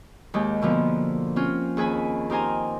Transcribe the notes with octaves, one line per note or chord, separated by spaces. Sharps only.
D#2 G#3 G4
B2 D3 F3 A#3 B3
C4 C#4 F4
D#2 G#4 B4 G#5 B5
D#4 G4 A#4 C5 G#5 A#5